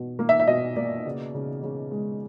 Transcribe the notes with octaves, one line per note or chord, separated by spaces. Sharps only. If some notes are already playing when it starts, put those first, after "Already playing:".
Already playing: B2
A#3
E5
E5
B2 D#5
A#3 D5
C#3
C#3
C#3
G#3